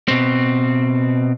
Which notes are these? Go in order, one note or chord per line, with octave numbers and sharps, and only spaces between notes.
B2 C4